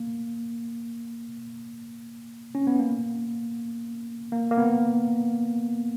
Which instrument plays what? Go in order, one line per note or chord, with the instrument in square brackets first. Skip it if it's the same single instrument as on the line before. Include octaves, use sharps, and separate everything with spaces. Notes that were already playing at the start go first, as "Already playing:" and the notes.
Already playing: [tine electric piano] A#3
C#4
B3
A#3
A#3
A#3
B3